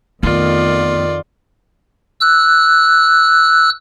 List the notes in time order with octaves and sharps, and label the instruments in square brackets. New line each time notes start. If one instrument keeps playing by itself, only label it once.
[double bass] F2 D#3 [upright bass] A3 B3 [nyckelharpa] F4 D5
[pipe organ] E6 F#6